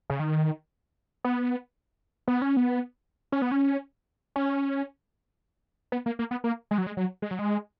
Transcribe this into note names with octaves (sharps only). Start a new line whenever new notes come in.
C#3
D#3
B3
B3
C#4
B3
C#4
B3
C#4
C#4
B3
A#3
A#3
B3
A#3
G#3
F#3
G#3
F#3
G#3
F#3
G#3